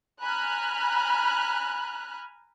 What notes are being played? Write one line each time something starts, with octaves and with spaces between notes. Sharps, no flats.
G#5 A#5 B5 F6 F#6